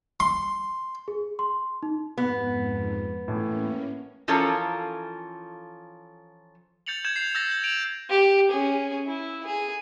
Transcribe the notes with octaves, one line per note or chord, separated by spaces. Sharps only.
C6
G#4
C6
D#4
F2 G#2 B3
A2 E3 A#3 C#4
E3 F3 C#4 F4 A4 A#4
G6 A6 C#7 F7 F#7
G6 G#6 E7 F#7
C7
E6 G6 A6 A#6
F#7
G6 D7 E7 F7
G4
C#4 G#4
E4
G#4